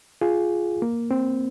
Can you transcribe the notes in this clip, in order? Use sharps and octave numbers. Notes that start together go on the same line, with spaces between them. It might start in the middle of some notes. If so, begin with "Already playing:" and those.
F4 G#4
A#3
C4